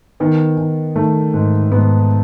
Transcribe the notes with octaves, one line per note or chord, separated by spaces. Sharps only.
D#3 B3
D#3
D#3 A3
G#2
G#2 B3